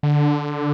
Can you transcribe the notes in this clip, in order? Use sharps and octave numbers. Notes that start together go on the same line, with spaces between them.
D3